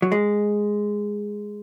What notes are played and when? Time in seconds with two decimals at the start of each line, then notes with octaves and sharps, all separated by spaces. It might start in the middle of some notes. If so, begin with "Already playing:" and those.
0.02 F#3
0.12 G#3